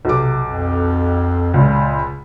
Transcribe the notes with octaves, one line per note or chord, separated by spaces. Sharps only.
B1 C3 D6
F2
C#2 A#2 F4